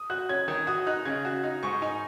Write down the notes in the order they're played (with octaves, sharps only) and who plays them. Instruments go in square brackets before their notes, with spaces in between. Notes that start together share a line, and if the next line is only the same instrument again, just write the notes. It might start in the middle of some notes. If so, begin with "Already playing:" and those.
Already playing: [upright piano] D#6
[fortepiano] F#4 [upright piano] F#6
[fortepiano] C#4 [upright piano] G#6
[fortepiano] D#3 [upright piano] G#6
[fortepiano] F#4 [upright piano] D#6
[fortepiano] D#4 [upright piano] F#6
[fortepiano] C#3 [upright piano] G#6
[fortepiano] F#4
D#4
[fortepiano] G#2 [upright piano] C#6
[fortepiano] D#4 [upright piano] G#5